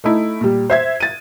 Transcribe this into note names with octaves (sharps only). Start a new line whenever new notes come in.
A3 D#4 E4
A#2 G3
C5 E5 G#6
A6 D#7